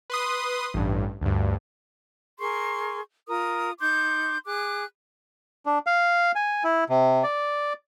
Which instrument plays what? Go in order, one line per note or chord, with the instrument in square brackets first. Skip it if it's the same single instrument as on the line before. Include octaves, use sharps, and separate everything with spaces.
[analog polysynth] B4 C6 D#6
A1 G2
D2 G2
[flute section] G#4 A#4 C6 C#6
F4 A#4 D#6
D#4 C6 D6 G6
G#4 D6 F#6
[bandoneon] D4
F5
G#5
E4
C3
D5